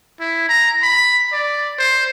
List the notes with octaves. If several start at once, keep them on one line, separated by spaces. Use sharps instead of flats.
E4
A#5
B5
D5
C5